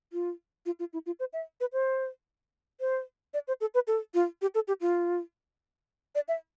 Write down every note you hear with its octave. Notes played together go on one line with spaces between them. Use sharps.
F4
F4
F4
E4
F4
C5
E5
B4
C5
C5
D5
C5
A4
B4
A4
F4
G4
A4
G4
F4
D5
E5